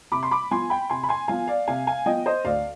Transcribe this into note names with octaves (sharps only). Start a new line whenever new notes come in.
C3 B5 D6
C6
B5 D6
F3 B3 G#5 C6
G5 B5
C3 G#5 C6
B5
G#5 C6
F3 B3 F5 G#5
D5 F5
C3 F5 G#5
F5 G#5
F3 B3 D#5 G5
C5 D#5
D2 D5 F5